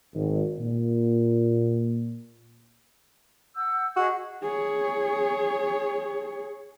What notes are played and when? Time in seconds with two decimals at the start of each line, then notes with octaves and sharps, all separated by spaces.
0.14 G#1
0.59 A#2
3.56 F#5 E6 G6
3.96 F#4 G#4 D#5
4.42 G#4 C#5